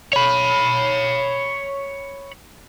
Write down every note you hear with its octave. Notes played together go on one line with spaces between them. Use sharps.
C#5 B5